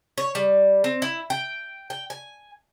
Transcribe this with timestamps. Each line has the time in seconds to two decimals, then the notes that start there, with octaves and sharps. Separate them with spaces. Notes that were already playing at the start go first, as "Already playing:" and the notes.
0.18 C#5
0.35 G3
0.84 C4
1.02 E4
1.30 G5
1.90 G5
2.10 G#5